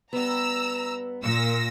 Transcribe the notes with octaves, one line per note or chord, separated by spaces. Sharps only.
G2 B3 A#5 E6
A#2 E6 A#6